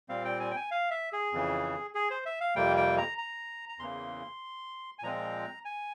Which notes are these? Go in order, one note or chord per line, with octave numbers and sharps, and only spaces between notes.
A#2 G3 C4 F5
G5
G#5
G5
G#5
F5
E5
G#4
F2 C#3 E3
G#4
C5
E5
F5
F2 C3 G3 A#3 G5
G5
A#5
A#5
A#5
E2 C#3 E3 A#3 C6
G#5
A#2 F3 G#3 C4 A#5
G#5